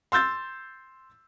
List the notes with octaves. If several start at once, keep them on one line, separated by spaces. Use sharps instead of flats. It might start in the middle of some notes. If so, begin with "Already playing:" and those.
C6 E6 G6 A6